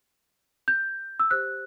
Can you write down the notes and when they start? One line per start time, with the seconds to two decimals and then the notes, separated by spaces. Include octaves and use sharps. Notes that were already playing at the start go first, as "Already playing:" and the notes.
0.68 G6
1.20 E6
1.31 G4 C5 F#6